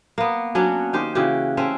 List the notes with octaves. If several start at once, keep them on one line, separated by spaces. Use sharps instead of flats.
A#3 B3
F#3 C#4 D4 F#4
D#3 G4 C5
C#3 E3 F#4 G4
A3 C4 C#4 E5